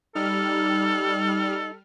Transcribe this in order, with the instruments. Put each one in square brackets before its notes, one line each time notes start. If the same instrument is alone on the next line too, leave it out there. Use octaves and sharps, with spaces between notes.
[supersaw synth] G3 F6 [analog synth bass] D#4 [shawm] A4